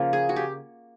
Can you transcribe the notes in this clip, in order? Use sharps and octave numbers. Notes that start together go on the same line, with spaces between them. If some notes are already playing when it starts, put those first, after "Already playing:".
Already playing: C#3 F3 A#3
G#4
F#4
G4